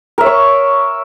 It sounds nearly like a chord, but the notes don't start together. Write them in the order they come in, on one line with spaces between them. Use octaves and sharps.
A#4 E5 C#5 C#6